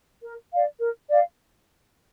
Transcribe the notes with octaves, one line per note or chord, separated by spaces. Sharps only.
A#4
D5 F5
A#4
D5 F5